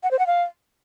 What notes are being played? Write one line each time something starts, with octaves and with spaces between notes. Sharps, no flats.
F#5
C5
F#5
F5